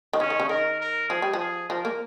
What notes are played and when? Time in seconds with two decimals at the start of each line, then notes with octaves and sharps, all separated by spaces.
0.13 D#3
0.20 C#3 C#4
0.30 D#3
0.40 C#3
0.49 D#3 A#4
0.80 A#4
1.09 F3 G#4
1.22 G3
1.33 F3
1.39 G#4
1.70 F3 A#4
1.85 A#3